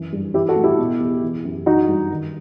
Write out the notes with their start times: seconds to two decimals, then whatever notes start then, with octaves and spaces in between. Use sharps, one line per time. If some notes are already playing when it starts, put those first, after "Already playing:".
Already playing: F#2 E3
0.13 G2
0.34 E3 E4 G4
0.49 F#4 A4
0.56 A2
0.64 E4 G4
0.79 B2
1.00 E2
1.22 E3
1.45 F#2
1.66 E3 D#4 F#4
1.88 G2
2.10 D#3